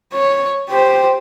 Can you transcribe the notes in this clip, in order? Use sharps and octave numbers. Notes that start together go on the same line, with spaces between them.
C#5
G4 C5